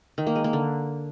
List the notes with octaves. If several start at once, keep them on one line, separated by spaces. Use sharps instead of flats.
D#3
A#3
G#3
A#3
D3